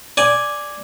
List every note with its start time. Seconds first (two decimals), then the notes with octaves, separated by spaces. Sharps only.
0.17 D5 G#5